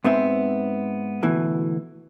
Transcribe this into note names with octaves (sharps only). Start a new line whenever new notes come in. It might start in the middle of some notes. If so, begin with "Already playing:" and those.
G#2 B3 C4 E5
D2 B2 E3